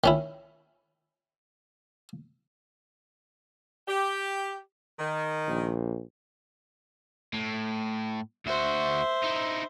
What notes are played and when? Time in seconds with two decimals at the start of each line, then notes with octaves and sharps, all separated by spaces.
0.04 D#3 C#4 E4
3.87 G4
4.99 D#3
5.48 A#1
7.33 A2
8.46 D2 F#4 C5 E5
9.23 D#4 E4